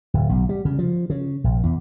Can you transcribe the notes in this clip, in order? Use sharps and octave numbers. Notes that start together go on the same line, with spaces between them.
D1
B1
G3
C#3
F3
C#3
A#1
E2